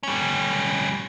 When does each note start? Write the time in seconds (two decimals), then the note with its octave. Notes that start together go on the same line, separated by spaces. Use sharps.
0.03 G3 C#4